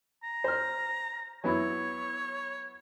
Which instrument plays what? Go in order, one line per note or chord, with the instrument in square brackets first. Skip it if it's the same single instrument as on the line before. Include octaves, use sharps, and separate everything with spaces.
[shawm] A#5
[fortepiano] C5 F6
[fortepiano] F#3 B3 E4 [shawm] C#5